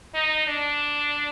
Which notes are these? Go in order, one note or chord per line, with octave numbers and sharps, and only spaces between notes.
D#4
D4